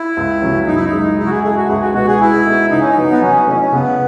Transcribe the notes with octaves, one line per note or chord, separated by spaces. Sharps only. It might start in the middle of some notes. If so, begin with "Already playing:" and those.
Already playing: E4
C#2
C#3 F#3 C#4
F#2 D#4
E4
D#4
C#3 G#3
G#3 E4
F#4
G#4
D#4 G#4 A4 E5
F#4
C#2 G#4
F#4
B2 G#3 B3 D#4 F#4
G#4
G#3 E4
B3 D#4 F#4 A4
C#3 D#4
C#4
D#4
F#3 B3 F#4 B4
B3
F#3 C#4
A3 C#4 E4 B4 D#5
C#4
C#3 B3